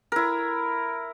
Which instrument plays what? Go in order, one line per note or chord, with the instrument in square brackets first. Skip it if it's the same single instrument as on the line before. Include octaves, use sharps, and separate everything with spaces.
[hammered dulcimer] E4 A#4